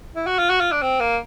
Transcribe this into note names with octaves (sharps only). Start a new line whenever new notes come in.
E4
F#4
F4
F#4
F4
D4
C4
A#3